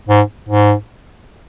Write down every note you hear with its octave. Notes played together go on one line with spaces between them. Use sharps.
G#2
G#2